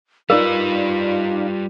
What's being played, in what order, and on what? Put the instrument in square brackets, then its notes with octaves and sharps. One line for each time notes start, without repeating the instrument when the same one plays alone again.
[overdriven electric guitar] G3 B4 [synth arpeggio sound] D#4 D5 F5 [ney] F4 [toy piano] A#4